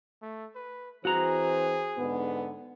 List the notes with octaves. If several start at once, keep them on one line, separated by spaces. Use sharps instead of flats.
A3
B4
E3 C4 F#4 G#4 C5 A#5
G#2 D3 B3